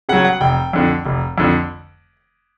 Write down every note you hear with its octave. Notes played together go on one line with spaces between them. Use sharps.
C#3 F#3 F#5
F#5
F1 G5
F2 D3
F1
F2 D3